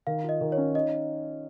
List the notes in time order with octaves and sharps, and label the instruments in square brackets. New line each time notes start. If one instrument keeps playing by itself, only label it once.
[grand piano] D#3 [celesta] F5
[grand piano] F4
[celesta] D#5
[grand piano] D#3
[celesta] C#5
[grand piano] C#4
[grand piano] D#4 [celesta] D#5